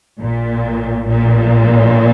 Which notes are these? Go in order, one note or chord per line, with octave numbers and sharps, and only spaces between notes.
A#1 A#2
A#1 A#2